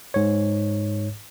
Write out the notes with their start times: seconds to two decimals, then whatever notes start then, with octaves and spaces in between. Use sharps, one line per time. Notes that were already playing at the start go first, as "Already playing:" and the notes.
0.14 G#2 C#5